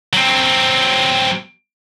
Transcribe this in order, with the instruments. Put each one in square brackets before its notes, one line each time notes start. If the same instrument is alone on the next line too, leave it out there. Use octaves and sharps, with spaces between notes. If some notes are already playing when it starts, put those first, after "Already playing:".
[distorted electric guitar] F#3 C4